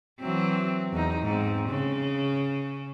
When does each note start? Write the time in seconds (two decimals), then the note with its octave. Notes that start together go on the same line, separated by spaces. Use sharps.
0.20 E3 F#3 C4
0.93 E2 D#4
1.22 G#2 C4
1.69 C#3